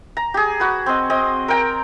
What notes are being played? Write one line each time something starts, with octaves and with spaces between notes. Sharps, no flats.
A#5
G4 G#4
F#4 B4
C4 D#5
C4 D#5
A#4 G5 A#5